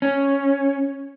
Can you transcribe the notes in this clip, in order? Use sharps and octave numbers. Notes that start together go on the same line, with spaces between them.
C#4